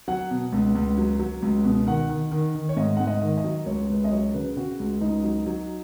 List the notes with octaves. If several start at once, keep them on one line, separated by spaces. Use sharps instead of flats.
F#3 F#5
B2
C#2
C#2
F#3
F#3
C#2
B2
D#3 F#5
D#3
D#3
D#3
C#5
G#2 D#5
G#2 F#5
D#5
D#3
D#5
F#3
C#2 C#5
C#2 B4
D#5
F#3 C#5
C#3 B4
C#3 F#4
C#2
C#2 D#4
F#3
F#3